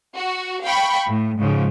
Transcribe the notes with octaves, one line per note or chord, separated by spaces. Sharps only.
F#4
F5 G5 B5 C#6
A2
G#2 C#3 F3